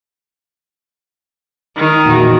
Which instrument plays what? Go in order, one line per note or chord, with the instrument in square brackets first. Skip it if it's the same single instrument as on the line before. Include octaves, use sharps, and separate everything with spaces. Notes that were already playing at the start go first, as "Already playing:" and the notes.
[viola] D#3
[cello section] E2 A#2 F#4